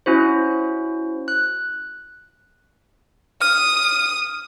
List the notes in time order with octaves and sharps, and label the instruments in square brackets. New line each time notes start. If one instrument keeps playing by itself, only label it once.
[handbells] C#4 E4 F#4 C5
F#6
[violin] D#6 [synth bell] F6